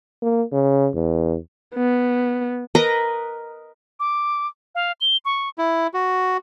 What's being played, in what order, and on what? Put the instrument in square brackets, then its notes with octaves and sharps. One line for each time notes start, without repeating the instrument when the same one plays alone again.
[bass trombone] A#3
C#3
E2
[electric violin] B3
[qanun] A#4 B4 D#5 A#5
[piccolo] D6
F5
G7
C#6
[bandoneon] E4
F#4